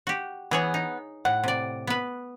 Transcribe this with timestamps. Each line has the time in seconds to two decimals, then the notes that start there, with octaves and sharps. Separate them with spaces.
0.07 F#4 G4
0.51 E3 B3 G#4 C#5
0.74 D#4
1.25 A2 F#5
1.44 C3 D5
1.87 B3 B4